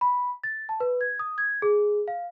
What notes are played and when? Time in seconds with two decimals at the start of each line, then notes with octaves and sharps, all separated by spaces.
0.01 B5
0.44 A6
0.69 A5
0.80 B4
1.01 G#6
1.19 D#6
1.38 G#6
1.62 G#4
2.08 F5